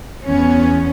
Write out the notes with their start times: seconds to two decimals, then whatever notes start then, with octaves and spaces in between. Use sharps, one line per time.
0.23 E2 B3 C#4